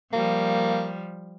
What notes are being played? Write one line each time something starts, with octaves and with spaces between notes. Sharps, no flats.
F3 G3 A#3